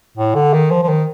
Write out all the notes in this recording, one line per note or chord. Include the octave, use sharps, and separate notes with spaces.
A2
D3
D#3
F3
F3
D#3